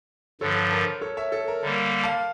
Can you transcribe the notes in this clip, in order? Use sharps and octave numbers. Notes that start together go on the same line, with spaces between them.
G2 D3 F3 A4 C#5
A#4
A4 C#5
C#5 E5
A4
A#4
D3 G3 A#3 A#4
F5 A5